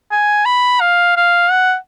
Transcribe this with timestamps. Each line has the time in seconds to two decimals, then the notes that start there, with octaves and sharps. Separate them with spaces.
0.11 G#5
0.45 B5
0.80 F5
1.16 F5
1.51 F#5